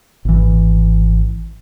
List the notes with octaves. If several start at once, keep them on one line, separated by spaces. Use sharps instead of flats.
G#1 E3